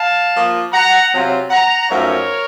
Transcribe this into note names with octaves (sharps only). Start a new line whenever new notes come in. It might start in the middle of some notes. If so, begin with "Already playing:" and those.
Already playing: F5 A5
F3 A#3 F4
F#5 A#5
C3 F#3 C4 F4
F#5 A#5
F#2 F3 A3 D#4 A#4 C#5